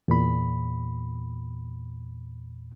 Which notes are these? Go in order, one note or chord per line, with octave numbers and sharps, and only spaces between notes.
E2 A#2 B5